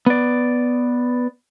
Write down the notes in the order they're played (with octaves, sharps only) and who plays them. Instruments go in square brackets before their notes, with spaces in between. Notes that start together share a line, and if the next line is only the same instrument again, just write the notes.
[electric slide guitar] B3 D5